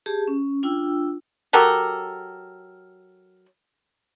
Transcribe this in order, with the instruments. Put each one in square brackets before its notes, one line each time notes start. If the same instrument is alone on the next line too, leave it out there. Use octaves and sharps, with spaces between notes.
[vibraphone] G4 G#4 A5
C#4
D4 F4 G5 E6
[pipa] F#3 G4 A4 A#4